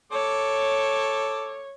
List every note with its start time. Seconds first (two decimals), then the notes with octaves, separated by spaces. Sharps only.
0.12 A4 C#5 D6